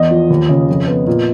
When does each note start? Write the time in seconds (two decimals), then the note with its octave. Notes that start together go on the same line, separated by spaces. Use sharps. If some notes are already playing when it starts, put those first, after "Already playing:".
Already playing: E2 D#5
0.11 F3
0.30 D#2
0.49 C#3
0.69 F2
0.87 B3
1.07 A#2